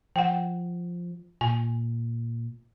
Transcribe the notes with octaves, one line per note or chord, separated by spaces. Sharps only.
F3 F#5 G5
A#2 G#5